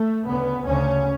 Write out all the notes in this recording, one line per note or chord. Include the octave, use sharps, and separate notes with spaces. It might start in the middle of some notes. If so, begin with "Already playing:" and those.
Already playing: A3
D2 C#3 B3
D2 C#3 C#4